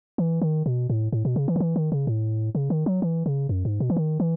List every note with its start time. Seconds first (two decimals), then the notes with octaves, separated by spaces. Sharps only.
0.18 E3
0.42 D#3
0.66 B2
0.90 A2
1.13 A2
1.25 B2
1.36 C#3
1.48 E3
1.56 D#3
1.60 E3
1.76 D#3
1.92 C#3
2.07 A2
2.55 C#3
2.70 D#3
2.86 F#3
3.02 E3
3.26 C#3
3.49 F#2
3.65 G#2
3.80 B2
3.90 E3
3.97 D#3
4.20 E3